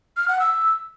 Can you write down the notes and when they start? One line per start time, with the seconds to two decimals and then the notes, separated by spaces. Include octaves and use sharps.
0.17 F6
0.28 F#5
0.40 E6